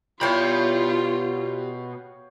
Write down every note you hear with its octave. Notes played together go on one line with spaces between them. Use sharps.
B2 G3 E4 F4 C#5 F5 G5 B5